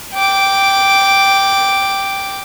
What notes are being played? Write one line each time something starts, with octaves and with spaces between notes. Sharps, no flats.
G5 D6